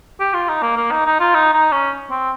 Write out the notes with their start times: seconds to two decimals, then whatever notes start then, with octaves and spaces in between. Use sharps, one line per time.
0.20 G4
0.34 F4
0.49 D#4
0.62 A#3
0.77 A#3
0.91 D#4
1.06 D#4
1.20 F4
1.35 D#4
1.54 D#4
1.72 C#4
2.10 C4